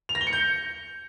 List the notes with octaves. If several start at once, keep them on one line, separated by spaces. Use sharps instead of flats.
F7
A#6
G7
C#7
G6